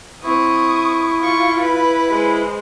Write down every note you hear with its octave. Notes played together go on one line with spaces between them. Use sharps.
C4 E4 C#6 D#6
F4 C#6
B4
G#3 C5